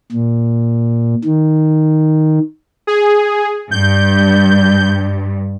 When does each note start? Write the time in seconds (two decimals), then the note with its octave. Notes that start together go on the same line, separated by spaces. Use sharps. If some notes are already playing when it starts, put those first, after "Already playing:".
0.12 A#2
1.25 D#3
2.87 G#4
3.71 G2 G6